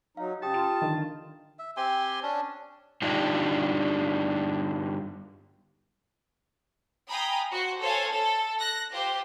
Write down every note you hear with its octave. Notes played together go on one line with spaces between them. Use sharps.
F#3 D#4 F5
C#3 G4 G5 A5 D#6
F4 E7
D3 D#3
E5
C4 G4 G#5 C6
C#4 D4
G2 D3 D4 D#4 F4 G4
F5 G5 G#5 A#5 B5 D#6
F#4 C5
A4 C5 C#5 F5 G#5
A4
F#6 A#6
F4 G4 C5